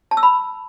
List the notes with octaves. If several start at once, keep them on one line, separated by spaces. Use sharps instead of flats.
A5
E6
B5